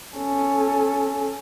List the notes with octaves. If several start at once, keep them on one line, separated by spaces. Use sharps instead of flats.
C#4 A4